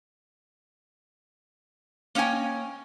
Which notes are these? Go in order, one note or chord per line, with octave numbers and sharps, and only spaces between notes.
A#3 C#4 D#5 G5 G#5